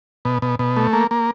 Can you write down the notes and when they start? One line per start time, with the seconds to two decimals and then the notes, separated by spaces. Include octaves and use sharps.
0.25 B2
0.42 B2
0.59 B2
0.77 A3
0.93 A#3
1.11 A#3